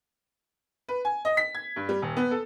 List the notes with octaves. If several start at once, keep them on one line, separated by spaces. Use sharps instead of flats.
B4
G#5
D#5
B6
G#6
G2
G3
D#1
B3
A4